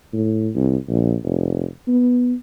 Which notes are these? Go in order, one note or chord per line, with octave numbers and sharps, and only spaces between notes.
A2
C2
A#1
F1
B3